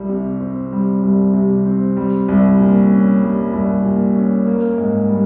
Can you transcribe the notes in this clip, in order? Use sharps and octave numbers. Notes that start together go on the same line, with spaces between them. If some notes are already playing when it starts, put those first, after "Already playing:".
Already playing: C2 G3
C3
C4
G3
C2
C3
C4
G3
C2
A#2
C#4
G3
C2
A#2
C#4
A#3
G#2
G3